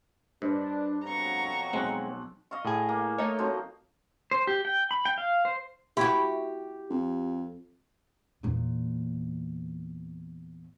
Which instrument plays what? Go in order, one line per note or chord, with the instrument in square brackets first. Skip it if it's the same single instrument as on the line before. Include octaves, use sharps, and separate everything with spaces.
[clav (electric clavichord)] G2 [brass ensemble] D4 [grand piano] B4 C5 D#5
[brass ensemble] F2 B2 F#3 [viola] A#5 C#6
[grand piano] B1 F#6 [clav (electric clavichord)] G#3 C4
[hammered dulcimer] D#5 F5 C#6
[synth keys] A2 G#4
[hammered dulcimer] A#3
[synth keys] A3 D#4 C#5 [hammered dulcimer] D#5
[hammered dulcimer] F3 F#3 C4
[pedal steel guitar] C5
G4
G5
B5
G5
F5
C5
[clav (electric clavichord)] E4 [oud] F#4 G4
[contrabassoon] F2
[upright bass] E2 A#2